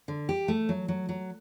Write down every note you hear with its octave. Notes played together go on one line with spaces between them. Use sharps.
D3
G4
A3
F#3
F#3
F#3